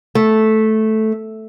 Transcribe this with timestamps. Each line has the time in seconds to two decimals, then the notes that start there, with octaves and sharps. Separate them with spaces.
0.15 A3